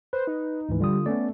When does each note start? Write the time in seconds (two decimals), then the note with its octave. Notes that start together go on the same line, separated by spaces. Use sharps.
0.13 B4 C5
0.27 D#4
0.69 D2 G#2 E3
0.80 D3 G3 F4 D#6
1.06 A3 B3 C#4 D5